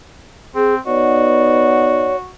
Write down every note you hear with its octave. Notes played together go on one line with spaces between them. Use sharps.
C4 G#4
B3 D#4 F#4 C#5 D5